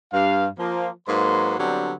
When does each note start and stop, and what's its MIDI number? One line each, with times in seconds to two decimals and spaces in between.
0.13 0.47 43
0.13 0.47 77
0.58 0.89 53
0.58 0.89 58
1.08 1.56 44
1.08 1.56 54
1.08 1.56 58
1.08 1.56 71
1.08 1.56 84
1.59 1.93 50
1.59 1.93 54
1.59 1.93 55
1.59 1.93 59
1.59 1.93 60
1.59 1.93 62